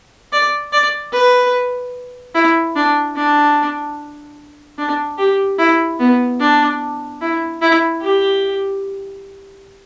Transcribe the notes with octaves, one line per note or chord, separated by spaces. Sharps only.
D5
D5
B4
E4
D4
D4
D4
G4
E4
B3
D4
E4
E4
G4